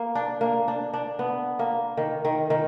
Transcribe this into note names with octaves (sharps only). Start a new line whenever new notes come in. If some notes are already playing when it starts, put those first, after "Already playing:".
Already playing: A#3
D4
A#3
D4
D4
B3
A#3
D#3
D#3
D#3